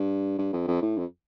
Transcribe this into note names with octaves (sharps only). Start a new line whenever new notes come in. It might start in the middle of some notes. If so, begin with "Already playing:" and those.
Already playing: G2
G2
F2
F2
A2
F2